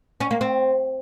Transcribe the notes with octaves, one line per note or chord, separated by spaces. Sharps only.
C#4
A#3
C4